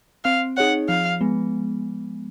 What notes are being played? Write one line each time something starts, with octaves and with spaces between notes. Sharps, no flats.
C4 F5
D#4 G#4 C#5 F#5
F3 F5
G#3 B3